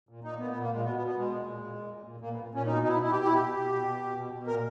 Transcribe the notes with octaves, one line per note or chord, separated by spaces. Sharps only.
A#2
A#2 D#4
A#2 B3
B3
A#2
A#3
A#2 G#3
B2 B3
B3
B2
B3
B2 G#3
A#2
A#2
A#2
A#2
A#2
A#2
A#2 A#3
B3
A#2
A#2 C#4
B2 D#4
B2 D#4
E4
B2
E4
B2 G4
B2 E4
G4
B2
B2
B2
B2
B2
B2
B2
A#2 A#4